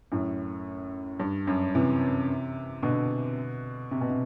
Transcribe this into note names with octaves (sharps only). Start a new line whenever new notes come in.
F#2 A2
G2
F#2
C3 E3
B2 D3
C3
B2
C3